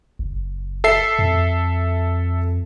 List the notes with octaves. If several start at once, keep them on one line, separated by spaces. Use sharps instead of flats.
F#1
A4 E5 C7
F2